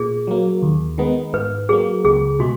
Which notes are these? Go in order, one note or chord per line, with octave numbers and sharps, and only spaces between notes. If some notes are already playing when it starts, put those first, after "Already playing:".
Already playing: A#2 G#4
F#3 A#3
D#2
D#3 G#3 B3 D#4
G#2 B4
F#3 A#3 G#4
C#2 G#4
B2 G#3 F#4